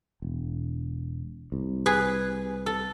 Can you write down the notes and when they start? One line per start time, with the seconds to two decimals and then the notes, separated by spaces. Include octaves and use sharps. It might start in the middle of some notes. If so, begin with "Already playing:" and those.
0.22 E1
1.52 C2
1.86 G#4 B4
2.66 A4